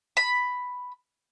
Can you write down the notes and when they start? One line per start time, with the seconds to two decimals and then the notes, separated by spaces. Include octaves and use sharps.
0.17 B5